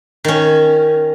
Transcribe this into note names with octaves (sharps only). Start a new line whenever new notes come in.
D#3 C#4